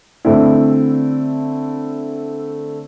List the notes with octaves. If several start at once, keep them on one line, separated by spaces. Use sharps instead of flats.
D3 A3 C4 E4